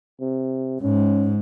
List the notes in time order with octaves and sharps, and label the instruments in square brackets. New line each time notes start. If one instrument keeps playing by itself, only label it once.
[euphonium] C3
[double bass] G#2 [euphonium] C#4